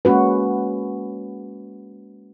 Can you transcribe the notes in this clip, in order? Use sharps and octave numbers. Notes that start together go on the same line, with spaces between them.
G#3 A#3 C#4 F#4 B4